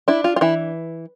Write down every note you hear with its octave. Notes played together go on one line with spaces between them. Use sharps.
D4 E4
F4
F4
E3 E4